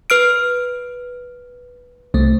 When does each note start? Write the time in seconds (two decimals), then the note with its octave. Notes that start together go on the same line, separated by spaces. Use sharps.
0.10 B4 F6 D7
2.14 C2 A3